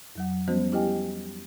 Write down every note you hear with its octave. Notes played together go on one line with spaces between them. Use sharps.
F2 F#3 F#5
F3 G3 B3 C#4 F#4 C5
E4 G4 D#5 G5 G#5